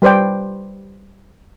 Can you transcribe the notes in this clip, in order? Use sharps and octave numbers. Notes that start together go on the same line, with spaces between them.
G3 B4 C5 D5 G5